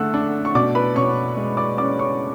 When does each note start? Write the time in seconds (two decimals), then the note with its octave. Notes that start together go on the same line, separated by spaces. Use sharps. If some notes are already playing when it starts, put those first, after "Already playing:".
Already playing: D3 A3 E5 F#5 E6 F#6
0.14 D4
0.45 C#6
0.55 B2 D5 D6
0.75 B4 B5
0.96 B2 C#5 C#6
1.37 G#3
1.57 D5 D6
1.78 C#4 D5 D6
1.99 C#5 C#6